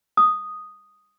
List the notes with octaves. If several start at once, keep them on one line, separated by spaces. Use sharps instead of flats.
D#6